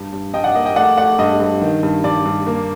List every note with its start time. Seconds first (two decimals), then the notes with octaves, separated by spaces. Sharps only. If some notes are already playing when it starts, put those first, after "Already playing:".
Already playing: G2
0.12 G2
0.34 G2 D#5 G5
0.44 D5 F#5
0.55 A#3 D#5
0.65 D#5 G5
0.76 A3 D5 F#5
0.97 A3 D5 F#5
1.18 G2 D#5
1.40 G2
1.61 D#3
1.83 G2
2.04 G2 D5
2.25 G2
2.47 A#3